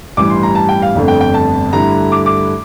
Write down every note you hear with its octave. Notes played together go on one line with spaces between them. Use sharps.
A1 G2 E3 G3 D6
C6
A#5
A5
G5
F5
G1 F2 D3 A3
G5
G5
A5
G2 D3 A3 E4 A#5
D6
D6